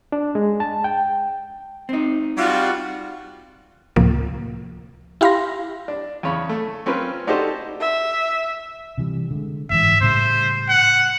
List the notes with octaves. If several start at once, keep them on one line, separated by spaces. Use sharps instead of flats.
D4
G#3
A5
G5
C4 D#4
G3 F4 F#4
C#2 A2 C3 F3 A#3
E4 G4 F5 B5 C6 A#6
D4
E2 C#3 C#5 B5
A3
C4 C#4 F4 A#4 B4
D4 D#4 F#4 G4 A4 C5
E5
C3 E3 G3
D3 G#3
A1 G#2 E3 E5
A2 C#3 G3 C5
F#5